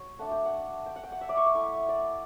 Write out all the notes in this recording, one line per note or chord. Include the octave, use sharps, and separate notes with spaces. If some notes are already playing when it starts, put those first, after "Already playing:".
Already playing: F#3 C#5
A3 D4 F#5
G5
F#5
G5
F#5
G5
F#5
E5
D5
C#6
D6
A3 E4 C#6
D5